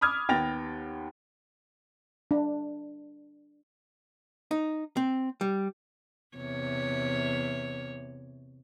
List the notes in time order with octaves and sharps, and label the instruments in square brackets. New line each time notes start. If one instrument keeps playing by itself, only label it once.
[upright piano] B5 D6 D#6 F6 G#6
D#2 B3 G5 A6 A#6 F7
[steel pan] D4
[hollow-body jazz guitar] D#4
C4
G3
[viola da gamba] E2 C3 C#5